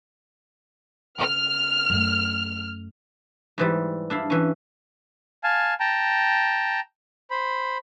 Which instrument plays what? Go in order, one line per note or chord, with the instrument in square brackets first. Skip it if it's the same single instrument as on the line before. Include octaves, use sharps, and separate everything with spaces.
[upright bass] C#3 [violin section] F6
[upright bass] F#2 A3
[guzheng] G#2 E3 G3
D4 E4 F5
E3 C#4
[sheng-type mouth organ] F5 G#5 A5
G5 A5 A#5
C5 B5